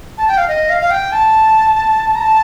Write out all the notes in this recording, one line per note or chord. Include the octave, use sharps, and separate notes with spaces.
A5
G5
F5
D#5
F5
F5
G5
A5
A#5
A5